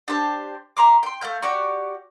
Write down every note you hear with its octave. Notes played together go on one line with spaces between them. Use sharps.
D4 G4 C5 A5
E5 A#5 C6 D6
G5 C6
A3 A#3 F5 G6
F#4 G4 D5 C#6